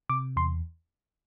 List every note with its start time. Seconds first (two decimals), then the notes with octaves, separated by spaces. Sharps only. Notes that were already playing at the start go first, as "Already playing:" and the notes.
0.10 C3 D6
0.36 E2 C6